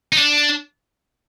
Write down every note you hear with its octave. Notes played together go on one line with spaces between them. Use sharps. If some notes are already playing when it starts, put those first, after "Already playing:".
D#4
D4